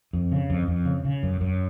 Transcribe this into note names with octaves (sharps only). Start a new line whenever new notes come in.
F2
C#3
F2
F2
C#3
C#3
F#2
F#2